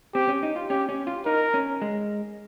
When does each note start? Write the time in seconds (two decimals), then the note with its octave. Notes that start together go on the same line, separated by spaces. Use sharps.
0.14 C4 G4
0.28 C#4
0.43 D#4
0.56 F4
0.70 C#4 G4
0.89 C#4
1.07 F4
1.26 D#4 A#4
1.54 C#4
1.82 G#3